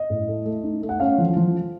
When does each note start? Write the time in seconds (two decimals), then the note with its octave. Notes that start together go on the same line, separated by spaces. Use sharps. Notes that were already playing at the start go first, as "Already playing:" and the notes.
Already playing: D#5
0.10 A2
0.28 A3
0.46 A3
0.64 D#4
0.82 A3
0.89 F#5
1.00 C#4 F5
1.18 F3
1.37 F3